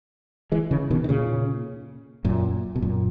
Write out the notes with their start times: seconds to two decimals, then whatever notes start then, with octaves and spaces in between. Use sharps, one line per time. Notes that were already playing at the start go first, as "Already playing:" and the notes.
0.52 E3 G#3
0.71 C#3 E3
0.90 B2 D#3
1.04 D#3
1.09 A#2 C#3
2.25 F#2 A#2
2.76 B2
2.82 F#2 A#2